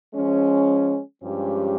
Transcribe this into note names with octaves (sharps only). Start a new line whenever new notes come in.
F3 G#3 C#4
G2 F3 G#3 C#4 G4